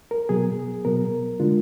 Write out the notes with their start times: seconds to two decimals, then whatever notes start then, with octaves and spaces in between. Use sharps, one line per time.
0.11 A#4
0.29 B2 F#3 B3 G#4
0.85 B2 F#3 B3 A#4
1.40 D3 G#3 D4 F4